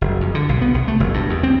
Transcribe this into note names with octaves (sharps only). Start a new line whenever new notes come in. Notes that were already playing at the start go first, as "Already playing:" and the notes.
F#1
F2
D3
B1
B3
C2
A3
F#1
G2
E2
C4